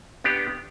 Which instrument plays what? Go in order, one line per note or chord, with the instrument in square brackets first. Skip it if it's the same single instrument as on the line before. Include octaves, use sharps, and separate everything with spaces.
[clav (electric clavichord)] B3 D4 G4